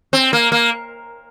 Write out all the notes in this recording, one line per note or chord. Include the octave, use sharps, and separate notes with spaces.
C4
A#3
A#3